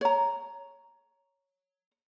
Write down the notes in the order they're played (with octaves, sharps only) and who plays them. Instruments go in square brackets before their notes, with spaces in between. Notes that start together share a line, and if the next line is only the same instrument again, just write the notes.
[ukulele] C#5 A#5